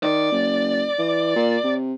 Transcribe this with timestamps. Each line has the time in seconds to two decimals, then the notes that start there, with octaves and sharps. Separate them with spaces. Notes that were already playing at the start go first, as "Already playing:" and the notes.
0.03 D#3 D5
0.32 F#1
0.99 E3
1.36 A#2
1.64 C3